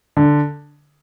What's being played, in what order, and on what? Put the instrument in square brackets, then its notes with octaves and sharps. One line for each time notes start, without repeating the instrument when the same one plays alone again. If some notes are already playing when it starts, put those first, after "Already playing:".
[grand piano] D3